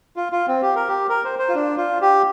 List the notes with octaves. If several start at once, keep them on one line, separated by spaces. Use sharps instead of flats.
F4
F4
C4
G4
A#4
G4
A#4
C5
C5
F4
D4
F4
G4